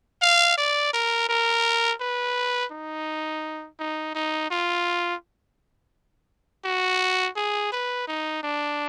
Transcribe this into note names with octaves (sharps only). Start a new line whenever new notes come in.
F5
D5
A#4
A#4
B4
D#4
D#4
D#4
F4
F#4
G#4
B4
D#4
D4